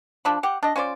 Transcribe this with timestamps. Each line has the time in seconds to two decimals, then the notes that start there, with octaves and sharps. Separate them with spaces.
0.25 F3 D4 B5
0.43 G4 F#5
0.63 D4 D#5
0.76 C#4 F4 C5 D5